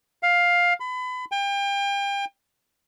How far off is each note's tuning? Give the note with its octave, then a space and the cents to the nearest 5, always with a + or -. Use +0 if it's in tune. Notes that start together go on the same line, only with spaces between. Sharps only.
F5 +10
B5 +30
G5 +35